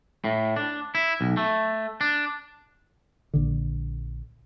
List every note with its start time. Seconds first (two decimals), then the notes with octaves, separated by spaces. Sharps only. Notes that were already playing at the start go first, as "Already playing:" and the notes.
0.24 A2
0.56 D4
0.95 E4
1.21 B1
1.37 A3
2.01 D4
3.33 A#1 D3